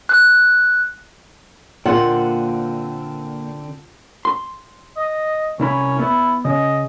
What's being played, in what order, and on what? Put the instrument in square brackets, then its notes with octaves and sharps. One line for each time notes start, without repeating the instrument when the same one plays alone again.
[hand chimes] F#6
[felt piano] A#2 A#3 [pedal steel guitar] D3 C4 [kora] F4 [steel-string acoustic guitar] F#5
[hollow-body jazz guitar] C6
[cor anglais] D#5
[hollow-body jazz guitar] C2 E4 B5 [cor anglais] C#4
[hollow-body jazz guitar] B3 [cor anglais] E4
[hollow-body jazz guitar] C#3 [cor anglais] D#5